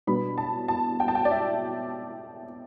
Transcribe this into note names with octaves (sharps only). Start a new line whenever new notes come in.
B2 G3 B3 D4 B5
A5
A5
G5
A5
G5
D5
E5